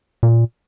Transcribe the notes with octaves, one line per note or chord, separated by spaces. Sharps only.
A#2